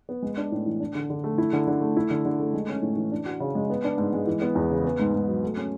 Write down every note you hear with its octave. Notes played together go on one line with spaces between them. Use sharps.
B3
G#3
D4
A2
E3
D4
D3
D3
A3
E4
D3
D3
A3
E4
D3
D3
A3
G#3
C#4
A2
E3
D4
F#4
C#3
G#3
B3
D4
G#2
G#3
E3
B3
E2
C#3
B3
G#2
G#2
F#3
A3
C#4